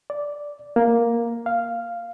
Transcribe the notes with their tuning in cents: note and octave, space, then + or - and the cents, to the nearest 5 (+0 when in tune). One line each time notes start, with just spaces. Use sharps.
D5 -5
A#3 +5
F5 -5